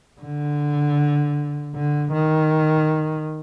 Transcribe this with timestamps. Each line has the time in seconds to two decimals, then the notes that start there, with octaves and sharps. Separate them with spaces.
0.21 D3
1.75 D3
2.13 D#3